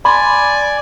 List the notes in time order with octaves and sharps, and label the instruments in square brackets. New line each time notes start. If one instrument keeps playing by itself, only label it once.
[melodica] D5 G#5 [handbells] B5 C6